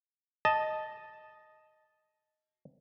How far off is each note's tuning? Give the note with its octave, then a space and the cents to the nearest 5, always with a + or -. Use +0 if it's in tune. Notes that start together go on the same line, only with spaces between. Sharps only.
D#5 +0 A5 -5